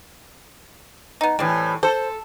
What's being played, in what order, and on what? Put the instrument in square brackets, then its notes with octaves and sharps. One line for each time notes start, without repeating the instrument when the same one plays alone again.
[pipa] B3 D#4
[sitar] A2 E3 [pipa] G3 C4
[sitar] A4 [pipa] C5